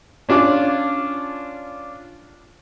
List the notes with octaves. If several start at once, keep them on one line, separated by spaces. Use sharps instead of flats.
C#4 D4 F4 D6